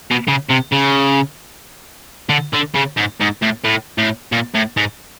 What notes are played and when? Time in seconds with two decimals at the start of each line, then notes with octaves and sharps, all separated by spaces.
0.11 B2
0.28 C#3
0.50 C3
0.73 C#3
2.29 D3
2.53 D3
2.74 C#3
2.97 G#2
3.20 G#2
3.42 A2
3.64 A2
3.98 A2
4.32 A#2
4.54 A2
4.77 G#2